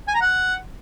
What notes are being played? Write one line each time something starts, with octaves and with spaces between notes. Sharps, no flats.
G#5
A#5
F#5